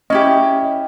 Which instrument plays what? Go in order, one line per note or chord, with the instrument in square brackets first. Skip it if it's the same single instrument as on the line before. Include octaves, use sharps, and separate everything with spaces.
[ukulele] C#4 E4 G4 [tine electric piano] D#5